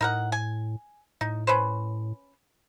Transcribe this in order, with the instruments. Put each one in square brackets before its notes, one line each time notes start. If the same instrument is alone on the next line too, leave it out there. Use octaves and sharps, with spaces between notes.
[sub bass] A2 [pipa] D#4 A#4 F#5
[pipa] G#5
[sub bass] A2 [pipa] D#4
[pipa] C#4 B4 C5